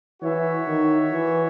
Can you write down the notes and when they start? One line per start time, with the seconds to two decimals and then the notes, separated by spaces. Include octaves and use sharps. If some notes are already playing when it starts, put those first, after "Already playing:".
0.22 E3 F#4 C#5 E5
0.67 D#3
1.12 E3